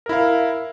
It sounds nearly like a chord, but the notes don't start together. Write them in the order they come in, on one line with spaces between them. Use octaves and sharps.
A#4 E4 F5